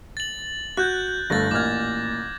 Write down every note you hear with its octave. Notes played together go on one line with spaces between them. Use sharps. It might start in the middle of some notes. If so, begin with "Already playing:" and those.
A6 F#7
F#4 F#6 G6
G1 A3 A6 A#6
A1 A#2 D6 F6 G#6